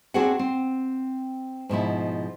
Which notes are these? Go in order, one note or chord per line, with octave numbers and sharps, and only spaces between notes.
C4 D4 F#4 G#4 C5 F#5
C4
G#2 B2 F3 E4